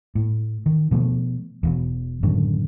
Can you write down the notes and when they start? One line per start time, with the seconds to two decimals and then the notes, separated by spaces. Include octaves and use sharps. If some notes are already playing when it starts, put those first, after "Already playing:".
0.15 A2
0.66 D#3
0.91 B2 F3 A3
1.63 E1 E2
2.23 F#2 A2 D3 D#3